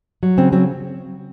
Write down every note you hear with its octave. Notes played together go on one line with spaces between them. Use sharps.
F#3
C#3 C4
F#3 C4